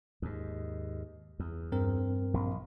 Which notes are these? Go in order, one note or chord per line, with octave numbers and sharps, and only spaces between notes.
D#2 G#2
E2
G2 C4 A#4
A#1